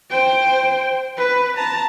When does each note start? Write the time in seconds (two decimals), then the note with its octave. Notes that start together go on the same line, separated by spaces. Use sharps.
0.10 C5 G5
1.17 B4
1.55 A5 A#5